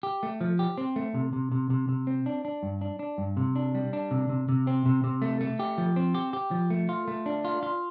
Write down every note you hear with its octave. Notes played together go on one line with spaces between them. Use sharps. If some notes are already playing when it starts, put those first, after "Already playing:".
G4
A3
F3
G4
C4
A3
C3
C3
C3
C3
C3
C4
D4
D4
G2
D4
D4
G2
C3
D4
G3
D4
C3
C3
C3
C4
C3
C3
A3
A3
G4
F3
C4
G4
G4
F3
A3
F4
A3
D4
F4
F4